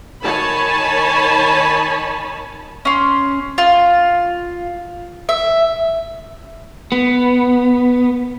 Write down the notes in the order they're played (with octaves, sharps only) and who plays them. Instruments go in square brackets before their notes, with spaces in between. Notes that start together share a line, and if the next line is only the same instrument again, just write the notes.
[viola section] D#3 C#5 G#5 A5 B5
[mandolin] C#4 C6
F4
E5
[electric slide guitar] B3